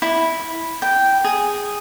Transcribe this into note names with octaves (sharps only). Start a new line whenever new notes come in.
E4
G5
G#4